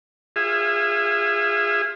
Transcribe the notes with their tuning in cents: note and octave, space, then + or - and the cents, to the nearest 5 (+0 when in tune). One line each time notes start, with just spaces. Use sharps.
F4 +10 G#4 -20 E5 +20